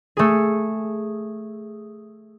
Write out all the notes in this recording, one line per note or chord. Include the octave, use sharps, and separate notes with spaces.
A3 G#4